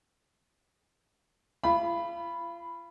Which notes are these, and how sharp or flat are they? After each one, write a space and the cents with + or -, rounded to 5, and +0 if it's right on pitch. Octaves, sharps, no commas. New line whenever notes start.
F4 -35 B5 +0